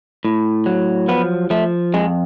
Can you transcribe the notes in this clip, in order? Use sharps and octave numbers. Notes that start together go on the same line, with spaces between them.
A2
F#3
F3 B3
F3 A3
F2 G#3